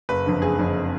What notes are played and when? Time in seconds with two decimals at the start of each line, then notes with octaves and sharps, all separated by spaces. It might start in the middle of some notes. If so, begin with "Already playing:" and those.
0.09 F#1 B4
0.26 F2 D3
0.41 F#1 G#4
0.58 F2 D3